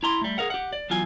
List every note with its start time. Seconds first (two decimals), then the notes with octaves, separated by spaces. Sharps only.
0.03 E4 A#5 C6
0.21 G3 A3
0.38 G#4 A#4 F5 F#5
0.50 G4 F#5
0.73 D5
0.90 E2 F#3 F4 G#5